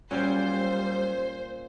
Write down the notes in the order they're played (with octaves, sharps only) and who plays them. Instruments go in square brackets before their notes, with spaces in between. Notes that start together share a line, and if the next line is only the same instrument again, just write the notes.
[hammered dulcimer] A#2 [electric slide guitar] F#3 G3 [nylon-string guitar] C#4 [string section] C5